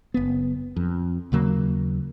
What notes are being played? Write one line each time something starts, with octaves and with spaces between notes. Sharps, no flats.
F#1 B3
F2
D#2 C#3 F#3 A#3